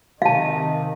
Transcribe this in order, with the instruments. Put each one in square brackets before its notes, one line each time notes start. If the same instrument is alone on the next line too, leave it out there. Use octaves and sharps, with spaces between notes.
[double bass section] C3 D#3 [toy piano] F5 A5